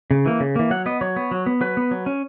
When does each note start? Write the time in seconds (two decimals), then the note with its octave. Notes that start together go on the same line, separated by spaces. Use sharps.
0.11 C#3
0.26 E3 A#3
0.40 C#3
0.56 E3 A#3
0.70 F#3 F#5
0.86 B3 D#5
1.01 F#3 C#5
1.16 B3
1.31 F#3
1.46 B3
1.61 F#3 B4
1.77 B3
1.91 F#3
2.06 C#4